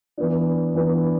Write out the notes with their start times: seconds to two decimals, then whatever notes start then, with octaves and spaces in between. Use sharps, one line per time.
0.18 E3 B3 D4
0.75 E3 B3 D4